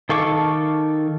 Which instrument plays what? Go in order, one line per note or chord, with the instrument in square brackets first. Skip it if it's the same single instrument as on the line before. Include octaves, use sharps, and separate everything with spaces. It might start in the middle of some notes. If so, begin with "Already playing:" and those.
[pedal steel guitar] D#3 A4 F5 C#6 D6